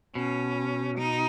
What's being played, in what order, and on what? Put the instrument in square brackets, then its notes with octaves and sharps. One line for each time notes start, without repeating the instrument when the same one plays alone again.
[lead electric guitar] B2 [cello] C#4
[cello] D#4